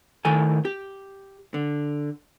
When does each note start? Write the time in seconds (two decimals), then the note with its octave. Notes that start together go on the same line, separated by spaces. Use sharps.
0.25 A2 D#3 A4 G#5
0.65 G4
1.54 D3